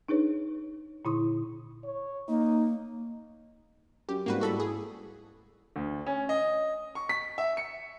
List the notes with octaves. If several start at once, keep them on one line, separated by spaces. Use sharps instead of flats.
D4 D#4 G#4 B4 C#5
A#2 D3 E4 C6 C#6 D#6
C#5
A#3 D#4
F#2 G4
G#1 G#2 G3 A#3 F#4 B4
A2 F#4 A4 B5
G#4
D2
C#4
D#5
C#6
B6
E5
C#7